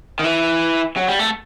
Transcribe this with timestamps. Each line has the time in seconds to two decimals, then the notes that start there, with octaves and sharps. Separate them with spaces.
0.19 D#3
0.24 E3
0.96 F#3
1.08 G3
1.19 A3